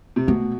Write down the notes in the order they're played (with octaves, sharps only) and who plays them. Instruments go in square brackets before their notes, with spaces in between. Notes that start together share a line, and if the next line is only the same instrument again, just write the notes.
[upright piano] C3
[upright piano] B2 [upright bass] A3